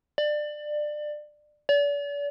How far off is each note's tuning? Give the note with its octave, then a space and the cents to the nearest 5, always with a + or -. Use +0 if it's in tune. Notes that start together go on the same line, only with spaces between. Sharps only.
D5 +20
D5 -40